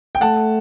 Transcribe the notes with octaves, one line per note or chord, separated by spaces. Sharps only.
G5
A3 F#5 A5